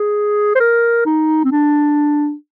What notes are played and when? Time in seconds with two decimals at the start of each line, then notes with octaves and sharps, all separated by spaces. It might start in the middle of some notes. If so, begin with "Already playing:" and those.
Already playing: G#4
0.55 C5
0.60 A#4
1.06 D#4
1.45 C4
1.51 D4